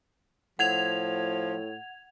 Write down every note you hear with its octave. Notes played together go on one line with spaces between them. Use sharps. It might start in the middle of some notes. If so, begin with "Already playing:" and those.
A2 F3 F#5 G#6 F7